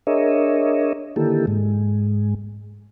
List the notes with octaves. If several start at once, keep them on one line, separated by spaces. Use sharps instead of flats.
D4 G#4 A#4 C#5 D#5 E5
D3 D#3 A#3 E4 G4 A4
G#2 G#3